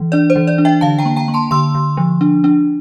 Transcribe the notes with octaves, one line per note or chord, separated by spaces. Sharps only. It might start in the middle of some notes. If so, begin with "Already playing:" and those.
Already playing: E3
D4 D5
C5
E3
D5
D4
E5 G5
D3 F5 A5
G5 A#5
A#3
G5 A#5
A#3
A5 C6
D3 C6 E6
D3
F3
D4
D4